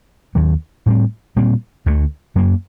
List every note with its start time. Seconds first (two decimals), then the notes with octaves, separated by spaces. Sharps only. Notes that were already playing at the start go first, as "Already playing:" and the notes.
0.35 D#2 D#3 F#3 A#3
0.86 A2 G3 C4
1.36 A#2 G3 C4
1.86 D2 D3 F#3 A3
2.35 F#2 F#3 A#3